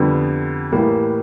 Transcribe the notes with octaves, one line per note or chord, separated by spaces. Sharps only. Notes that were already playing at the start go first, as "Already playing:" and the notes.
Already playing: F2 D3 G3 B3
A2 E3 G3 A#3